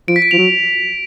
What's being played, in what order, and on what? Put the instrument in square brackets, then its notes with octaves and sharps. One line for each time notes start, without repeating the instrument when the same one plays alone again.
[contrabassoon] F3 [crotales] D7
[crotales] B6
D7
[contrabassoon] F3 [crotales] F7
[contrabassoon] F#3